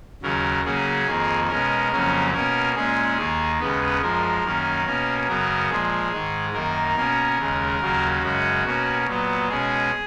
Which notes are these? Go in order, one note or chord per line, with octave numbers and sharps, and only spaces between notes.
D#2 C#3 F#3 A#4
C#3 F#3 A#3 C#4 G#4
F2 D#3 A#3
B2 G#3 C#4 A#4
F2 C#3 F#3 A#3 C#4
B2 A#3 C#4 A#4
A#2 G#3 C#4 G#4
D#2 D#3 A#3
D#2 C#3 G#3 B3 B4
F#2 F3 G#3 A#4
F#2 D#3 A#3 C#4
B2 A#3 C#4
F#2 C#3 F#3 B3 A#4
A#2 F3 G#3 G#4
G#2 D#3 G#3
F#2 D#3 A#3 A#4
B2 A#3 C#4
D#2 C#3 G#3
D#2 C#3 F#3 A#3
F#2 C#3 G#3 C#4 F#4
B2 A#3 C#4
A#2 F#3 B3
B2 G#3 C#4 G#4